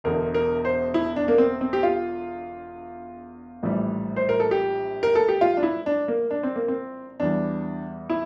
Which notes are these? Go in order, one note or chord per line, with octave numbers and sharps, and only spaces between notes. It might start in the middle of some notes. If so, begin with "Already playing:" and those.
E1 E2 D3 A#4
A#4
C5
E4
D4
A#3
C4
C4
G4
F4
A#1 A2 E3 G3
C5
A#4
A4
G4
A#4
A4
G4
F4
D4
E4
D4
A#3
D4
C4
A#3
C4
E2 E3 G3 D4
E4